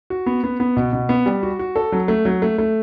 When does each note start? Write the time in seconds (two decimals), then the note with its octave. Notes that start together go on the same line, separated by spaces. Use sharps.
0.10 F#4
0.26 B3
0.44 B3
0.60 B3
0.77 B2
0.93 B2
1.09 B3
1.26 G3
1.43 F#4
1.59 F#4
1.76 A4
1.92 F#3
2.08 A3
2.25 F#3
2.42 A3
2.58 A3